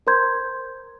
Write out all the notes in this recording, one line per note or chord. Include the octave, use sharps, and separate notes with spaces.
A#4 C5 A#5 C6 G6 G#6